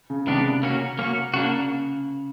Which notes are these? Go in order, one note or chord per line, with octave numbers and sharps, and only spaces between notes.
C#3
C3 D#3 G#3 B3 D4 G4
A#3 C#4 F#4
A#3 C#4 F#4
C#3 A#3 D4 F#4